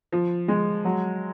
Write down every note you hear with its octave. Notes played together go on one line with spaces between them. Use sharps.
F3
G#3
F#3